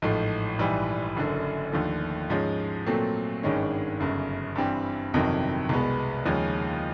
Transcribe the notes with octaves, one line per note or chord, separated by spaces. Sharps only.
A1 G#2 F3 A3
A#1 G#2 E3 G3
F#1 F#2 D3
D#2 D3 F3 A3
G#2 F3 G#3 C#4
A#2 F#3 A3 C4
G#1 G2 D#3 G#3 C#4
G1 F#2 C#3
G2 E3 G3 C4
G1 F2 C3 D#3 F#3
C2 B2 G#3 B3
D#2 C#3 F3 G#3 C#4